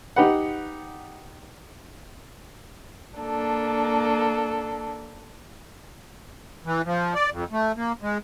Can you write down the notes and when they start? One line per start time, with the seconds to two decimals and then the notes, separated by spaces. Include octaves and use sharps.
0.16 D#4 G4 B4 F#5
3.17 A#3 D4 A4
6.65 E3
6.86 F3
7.15 D5
7.32 F2
7.52 A3
7.77 A#3
8.02 G#3